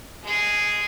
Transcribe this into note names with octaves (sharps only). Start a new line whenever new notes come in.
G#3 G#4